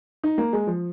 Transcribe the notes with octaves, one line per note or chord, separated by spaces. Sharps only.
D#4
A#3
G#3
F3